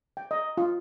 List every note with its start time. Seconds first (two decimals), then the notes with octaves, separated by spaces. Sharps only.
0.17 G5
0.31 D#5
0.57 F4